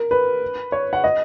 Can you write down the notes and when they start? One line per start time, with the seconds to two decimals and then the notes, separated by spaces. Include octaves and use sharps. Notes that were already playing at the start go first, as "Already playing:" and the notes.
Already playing: A#4
0.11 B4
0.72 C#5
0.93 F#5
1.04 D#5